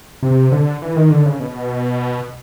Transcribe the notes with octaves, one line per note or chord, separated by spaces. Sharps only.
C3
D3
E3
D#3
D3
C#3
B2